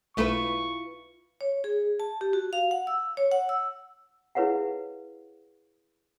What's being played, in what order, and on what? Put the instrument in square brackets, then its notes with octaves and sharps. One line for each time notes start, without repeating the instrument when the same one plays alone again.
[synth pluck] B1 A3 [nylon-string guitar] E4 F4 B4 [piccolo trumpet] C#6
[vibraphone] C#5
G#4
A5
G4
F#4
F5
F#5
E6
C#5
F#5
E6
[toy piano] E4 G#4 B4 C#5 F5 F#5